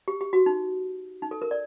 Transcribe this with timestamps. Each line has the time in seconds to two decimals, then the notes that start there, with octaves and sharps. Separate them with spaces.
0.08 G4
0.21 G4
0.33 F#4
0.46 D#4
1.22 D#4
1.31 A4
1.42 A#4
1.51 D5